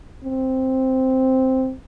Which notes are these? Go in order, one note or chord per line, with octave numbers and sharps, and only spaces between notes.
C4